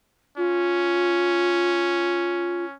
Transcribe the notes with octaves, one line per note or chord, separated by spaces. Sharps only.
C#4 F4